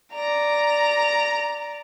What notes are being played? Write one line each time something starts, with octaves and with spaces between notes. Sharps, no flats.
D5 A#5